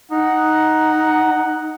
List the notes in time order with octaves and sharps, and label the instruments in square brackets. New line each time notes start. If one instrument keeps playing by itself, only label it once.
[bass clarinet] D#4 [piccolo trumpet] F#5